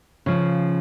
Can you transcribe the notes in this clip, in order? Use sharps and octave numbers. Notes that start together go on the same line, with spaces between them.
C#3 F3